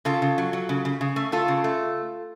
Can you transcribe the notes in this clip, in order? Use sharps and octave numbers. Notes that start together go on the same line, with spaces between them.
C#3 F4 A4
C#3
F#3
F#3
C#3
C#3
C#3
A3
A3 F4 A4
C#3
A3